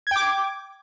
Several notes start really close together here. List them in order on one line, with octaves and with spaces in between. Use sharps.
G#6 G5 D6